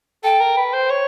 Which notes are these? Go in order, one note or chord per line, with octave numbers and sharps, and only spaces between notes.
A4 G5
A#4
B4
C5
C#5